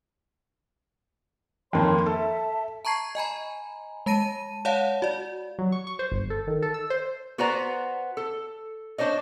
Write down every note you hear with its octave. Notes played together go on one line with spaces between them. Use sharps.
F2 D#3 A#3 C#5 B5 C6
A4 E5 A5
A5 A#5 C#6 G#6 C7
D#5 G#5 A#5 B5
G#3 A5 A#6 D#7
C#5 D5 F5 F#5 A5
F#4 D5
F#3
C#6
C#6
C5
G1
A4
D#3
A4
E6
C5
B3 F#4 B4 C5 D5 A#5
A4
D4 C5 C#5 D#5